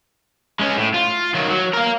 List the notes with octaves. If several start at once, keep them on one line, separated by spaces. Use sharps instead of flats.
G#3 C#4
A2
F4
D#3 F#3
F#3
A#4 F5